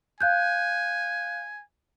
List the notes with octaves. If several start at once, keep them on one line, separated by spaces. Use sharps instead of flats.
F5 G#5 F#6 G6